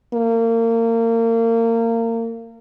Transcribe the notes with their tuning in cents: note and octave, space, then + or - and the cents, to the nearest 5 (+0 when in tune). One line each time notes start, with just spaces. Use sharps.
A#3 -30